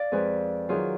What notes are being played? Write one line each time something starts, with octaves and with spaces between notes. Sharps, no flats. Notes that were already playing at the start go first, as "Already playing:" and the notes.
Already playing: D5 F5
F2 F3 G#3 G#4 B4
D#3 F#3 F4 G#4